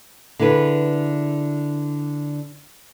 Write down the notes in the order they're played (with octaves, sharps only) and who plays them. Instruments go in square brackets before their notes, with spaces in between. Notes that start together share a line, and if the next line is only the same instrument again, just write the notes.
[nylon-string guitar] D3 E4 G#4 B4